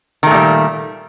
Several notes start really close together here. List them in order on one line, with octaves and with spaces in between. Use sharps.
D#3 A3 A#2 G3